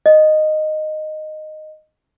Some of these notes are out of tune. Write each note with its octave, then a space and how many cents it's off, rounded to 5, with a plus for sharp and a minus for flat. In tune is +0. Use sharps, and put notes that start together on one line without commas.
D#5 -10